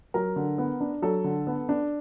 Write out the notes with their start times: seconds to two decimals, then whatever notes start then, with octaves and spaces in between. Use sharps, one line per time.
0.14 F#3 A#4
0.36 D3
0.58 B3
0.80 D4
1.02 F#3 A4
1.24 D3
1.47 B3
1.69 D4